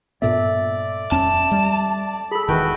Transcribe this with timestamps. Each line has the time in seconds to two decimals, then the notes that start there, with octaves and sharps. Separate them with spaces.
0.22 G2 A#2 B3 A4 D5 E5
1.12 D#1 F2 C#4 A5
1.51 G3
2.31 G#4 A4 B5
2.48 E1 D#3 E3 F#4 B4 G5